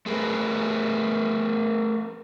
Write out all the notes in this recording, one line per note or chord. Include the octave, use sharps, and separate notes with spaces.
A3 G#4 A#4 B4